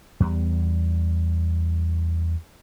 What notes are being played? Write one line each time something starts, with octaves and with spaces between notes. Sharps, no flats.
E2 G3